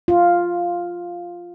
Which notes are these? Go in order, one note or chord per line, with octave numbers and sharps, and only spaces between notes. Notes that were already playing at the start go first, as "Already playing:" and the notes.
F4